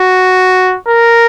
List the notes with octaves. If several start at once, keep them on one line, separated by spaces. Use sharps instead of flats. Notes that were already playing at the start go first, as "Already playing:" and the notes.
Already playing: F#4
A#4